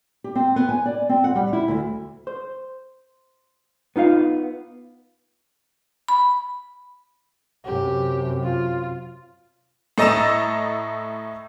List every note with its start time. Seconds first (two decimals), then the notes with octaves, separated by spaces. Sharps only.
0.24 G4
0.35 C4
0.56 B3
0.69 G#5
0.86 D5
1.09 C4
1.24 F#5
1.36 G3
1.53 E4
1.68 D2
2.27 C5
3.96 B3 D#4 F4 F5
6.09 B5
7.65 F#2 C3 G4
8.43 F4
9.98 A2 A4 D#5 A#5 E6 E7